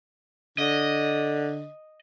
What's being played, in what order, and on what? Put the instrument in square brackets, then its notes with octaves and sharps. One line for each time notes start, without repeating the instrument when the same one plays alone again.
[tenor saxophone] D3 [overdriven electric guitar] D#5